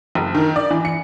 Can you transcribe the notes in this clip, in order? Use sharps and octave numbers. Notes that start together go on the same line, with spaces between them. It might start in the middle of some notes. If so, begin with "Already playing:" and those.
F#1
D#3
D5
E3
C#7